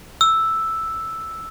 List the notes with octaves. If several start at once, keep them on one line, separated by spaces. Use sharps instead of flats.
E6